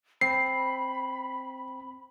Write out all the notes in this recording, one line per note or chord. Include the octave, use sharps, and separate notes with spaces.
C4 B5 C7